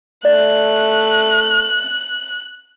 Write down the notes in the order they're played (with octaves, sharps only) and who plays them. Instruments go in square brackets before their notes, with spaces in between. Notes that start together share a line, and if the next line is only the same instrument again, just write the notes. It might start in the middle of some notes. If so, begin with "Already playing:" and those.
[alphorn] A3 [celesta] D5 [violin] F#6